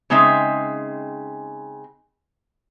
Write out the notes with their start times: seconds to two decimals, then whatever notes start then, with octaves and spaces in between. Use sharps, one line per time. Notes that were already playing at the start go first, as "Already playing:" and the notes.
0.10 C#3 G#3 C4 D#4 E5